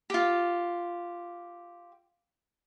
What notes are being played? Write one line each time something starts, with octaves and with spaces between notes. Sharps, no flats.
F4 G4